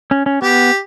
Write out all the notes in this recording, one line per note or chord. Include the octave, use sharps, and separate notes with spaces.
C#4
C#4
B3 G4